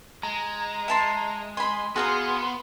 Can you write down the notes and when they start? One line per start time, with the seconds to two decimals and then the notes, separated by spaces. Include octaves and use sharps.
0.23 G#3 A#5
0.88 E5 A5 C6
1.57 G#5 B5 C6
1.96 B3 F#4 G#4 F5 A#5 C6